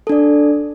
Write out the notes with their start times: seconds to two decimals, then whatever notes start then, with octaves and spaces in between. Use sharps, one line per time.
0.07 A4
0.09 D4
0.12 D5